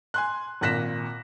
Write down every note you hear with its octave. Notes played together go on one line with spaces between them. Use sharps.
G#5 C6 F#6
G#1 A#2 F#6 A#6 B6 E7